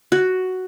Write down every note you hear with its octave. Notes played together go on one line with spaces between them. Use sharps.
F#4